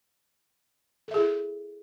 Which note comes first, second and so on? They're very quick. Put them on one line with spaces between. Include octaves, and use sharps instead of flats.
A4 E5 G#4 E4